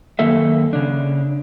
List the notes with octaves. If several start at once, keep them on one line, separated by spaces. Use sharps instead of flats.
F#2 D#3 A#3 A4 E5
C#3 D4